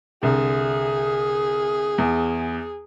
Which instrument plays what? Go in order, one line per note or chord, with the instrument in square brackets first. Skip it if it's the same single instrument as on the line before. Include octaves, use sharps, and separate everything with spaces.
[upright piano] C2 D3 [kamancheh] G#4
[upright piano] E2